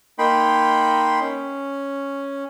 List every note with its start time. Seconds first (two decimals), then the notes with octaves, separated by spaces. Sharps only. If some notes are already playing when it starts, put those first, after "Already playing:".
0.19 A#3 D#4 G5 B5 C6
1.21 C#4